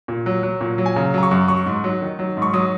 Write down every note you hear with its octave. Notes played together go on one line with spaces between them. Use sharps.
A#2
F#3
F#3
A#2
F#3
G#5
C#3 A#5
F#3 A#5
C#6
F#2
F#3 C#6
G#2
F#3
D#3
F#3
G#2
C#6
F#3 D#6